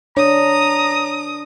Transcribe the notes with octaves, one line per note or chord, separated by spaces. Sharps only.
D4 C#5 A#5 D#6